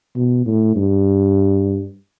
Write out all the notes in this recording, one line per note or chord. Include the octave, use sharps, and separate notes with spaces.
B2
A2
G2